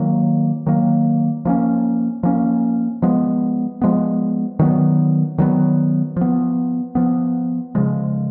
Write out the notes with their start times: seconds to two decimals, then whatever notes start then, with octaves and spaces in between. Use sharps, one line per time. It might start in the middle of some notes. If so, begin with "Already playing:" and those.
Already playing: D#3 F#3 A#3
0.66 D#3 F#3 A#3
1.45 F3 A#3 C#4
2.23 F3 A#3 C#4
3.02 F3 G#3 B3
3.82 F3 G#3 B3
4.59 D#3 F#3 B3
5.38 D#3 F#3 B3
6.17 F3 B3
6.95 F3 B3
7.75 C#3 F3 G#3